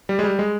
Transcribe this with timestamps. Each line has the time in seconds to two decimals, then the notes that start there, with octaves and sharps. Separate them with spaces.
0.09 G3
0.19 G#3
0.24 G3
0.39 G#3